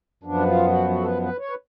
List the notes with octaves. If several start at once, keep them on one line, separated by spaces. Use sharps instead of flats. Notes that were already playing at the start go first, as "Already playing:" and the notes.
F#2 F3 B3 D4
F4
F#4
F#4
A4
B4
B4
C#5
B4